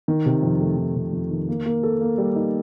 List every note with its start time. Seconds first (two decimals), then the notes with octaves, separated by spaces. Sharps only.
0.08 D#3
0.26 C3
0.43 F2
0.61 A3
0.78 D#3
0.95 C3
1.13 F2
1.31 D#3
1.49 A#3
1.66 A#3
1.83 A4
2.01 A#3
2.18 G3
2.35 D#4